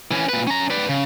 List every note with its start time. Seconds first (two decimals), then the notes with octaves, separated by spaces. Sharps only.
0.11 E3 C#4
0.29 A#2 B4
0.47 C#4 A#5
0.71 B4 D5
0.89 C#3